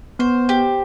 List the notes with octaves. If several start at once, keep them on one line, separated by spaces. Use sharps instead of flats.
B3 C5
G4